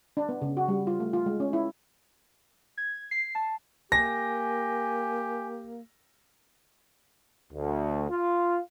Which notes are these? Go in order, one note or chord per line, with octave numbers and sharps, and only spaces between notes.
D4
B3
C#3
F#4
G3
F4
A3
F4
G#3
C#4
E4
G#6
C7
A5
A#3 G4 G#5 A#6
D2
F4